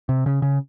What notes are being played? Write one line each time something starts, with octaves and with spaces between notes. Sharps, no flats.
C3
C#3
C#3